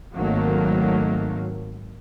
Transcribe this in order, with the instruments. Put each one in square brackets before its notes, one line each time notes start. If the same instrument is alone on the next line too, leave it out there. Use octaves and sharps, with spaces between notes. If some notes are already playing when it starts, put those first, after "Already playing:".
[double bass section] G#1 D#3 F#3 A3 A#3